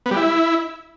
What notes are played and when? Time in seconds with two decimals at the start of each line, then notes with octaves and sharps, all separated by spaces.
0.06 B3
0.11 G3
0.17 E4